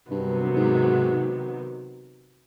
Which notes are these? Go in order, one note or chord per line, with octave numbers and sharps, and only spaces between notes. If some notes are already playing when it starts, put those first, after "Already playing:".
G2 C3 D#3 F#3 B3
G#2